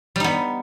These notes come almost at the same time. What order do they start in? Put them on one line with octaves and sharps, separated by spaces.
G3 D#4 B3